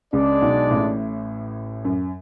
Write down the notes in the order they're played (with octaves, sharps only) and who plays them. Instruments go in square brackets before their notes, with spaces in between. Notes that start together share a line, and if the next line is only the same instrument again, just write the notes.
[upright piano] C#2 C#3 [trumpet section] G#3 D4 G#4 D5
[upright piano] B1 B2
A1 A2
F#2